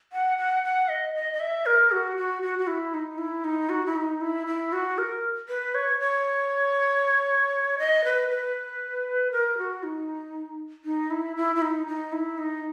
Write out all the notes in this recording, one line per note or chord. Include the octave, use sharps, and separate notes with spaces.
F#5
F#5
F#5
D#5
D#5
D#5
E5
A#4
F#4
F#4
F#4
F#4
E4
D#4
E4
D#4
F#4
E4
D#4
E4
E4
F#4
A#4
B4
C#5
C#5
D#5
B4
B4
A#4
F#4
D#4
D#4
E4
E4
E4
D#4
D#4
E4
D#4